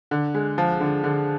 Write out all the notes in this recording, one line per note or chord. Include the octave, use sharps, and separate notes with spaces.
D3
G#3
F3
D3
D3